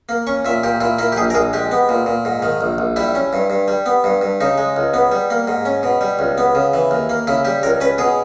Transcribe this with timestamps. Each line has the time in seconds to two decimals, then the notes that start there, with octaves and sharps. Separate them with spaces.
0.09 A#3
0.27 C#4 C#6
0.45 A#2 E5
0.63 A#2 G4
0.81 A#2 E4
0.98 A#3 E4
1.12 G4
1.16 A#1 G#4
1.30 A#4
1.35 A#1 G#4
1.53 G#3 G4
1.71 B3
1.89 A#2
2.06 A#2
2.25 G#2
2.42 D#3
2.61 A#1
2.78 A#1
2.96 G3 E4
3.15 C#4
3.33 G2
3.50 G2
3.68 G3
3.86 B3
4.04 G2
4.21 G2
4.41 C#3 D#4
4.58 G#3
4.76 C#2
4.94 B3
5.12 G3
5.30 A#3
5.48 G#2
5.65 C#4
5.83 B2
6.01 G3
6.19 C#2
6.38 B3
6.55 C#3
6.74 E3
6.91 D#2
7.09 A#3
7.27 C#3 E4
7.45 G3 G4
7.63 C#2 A#4
7.81 C#4 B4
7.98 B2 G#4